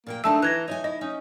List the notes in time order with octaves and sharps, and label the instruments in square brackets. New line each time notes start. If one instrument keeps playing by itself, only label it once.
[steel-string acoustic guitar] A#2 B4 G5 [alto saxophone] A#3
[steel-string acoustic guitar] G#3 D4 D#4 [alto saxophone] A3 [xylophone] A5 E6
[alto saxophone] E3 [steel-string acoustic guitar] A#5 [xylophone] F#6 G#6 A#6
[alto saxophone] D#4 [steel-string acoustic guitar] C#5 E5 G#5
[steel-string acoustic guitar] E4 [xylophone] D#5
[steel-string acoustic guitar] C#4 [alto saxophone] D#4